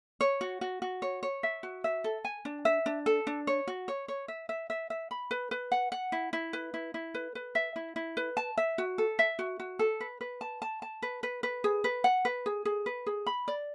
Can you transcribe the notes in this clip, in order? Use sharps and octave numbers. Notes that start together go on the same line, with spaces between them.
C#5
F#4
F#4
F#4
C#5
C#5
E5
F#4
E5
A4
G#5
D4
E5
D4
A4
D4
C#5
F#4
C#5
C#5
E5
E5
E5
E5
B5
B4
B4
F#5
F#5
E4
E4
B4
E4
E4
B4
B4
E5
E4
E4
B4
A5
E5
F#4
A4
E5
F#4
F#4
A4
B4
B4
A5
A5
A5
B4
B4
B4
G#4
B4
F#5
B4
G#4
G#4
B4
G#4
B5
D5